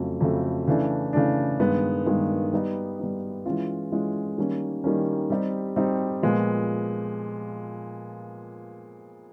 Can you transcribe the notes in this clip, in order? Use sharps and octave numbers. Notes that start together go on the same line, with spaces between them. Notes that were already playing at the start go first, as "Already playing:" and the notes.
Already playing: F2 C#3 F#3 A3
F2 C#3 F#3 A3
C#3 E3 A3 D4
C#3 E3 A3 D4
G2 D#3 G#3 B3
G2 D#3 G#3 B3
G3 B3 D#4
G3 B3 D#4
E3 G#3 C#4 F4
E3 G#3 C#4 F4
D#3 G3 A#3 C#4
D#3 G3 A#3 C#4
G3 C4 D#4 G4
G3 C4 D#4 G4
A#2 F3 G#3 B3